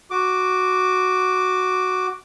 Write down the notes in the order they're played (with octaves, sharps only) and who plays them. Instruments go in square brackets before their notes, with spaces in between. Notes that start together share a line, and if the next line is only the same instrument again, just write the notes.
[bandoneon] F#4 D6